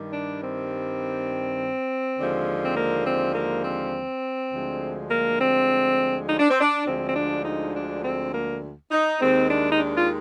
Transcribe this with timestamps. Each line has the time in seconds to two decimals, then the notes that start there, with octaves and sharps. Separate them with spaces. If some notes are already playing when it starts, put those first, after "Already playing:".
Already playing: G2 D#3 G3
0.13 D4
0.42 C4
2.18 D#2 D3 F3 G#3
2.65 C4
2.76 A#3
3.06 C4
3.35 A#3
3.65 C4
4.52 D2 D3 F3 G#3
5.10 A#3
5.40 C4
6.28 D#4
6.39 D4
6.50 C4
6.61 D4
6.86 D2 D3 F3 G#3 C4
7.08 C4
7.15 D4
7.45 D#4
7.75 D4
8.03 C4
8.33 A#3
8.91 D#4
9.20 D#2 D#3 G#3 C4
9.50 D4
9.72 D#4
9.79 D4
9.98 F4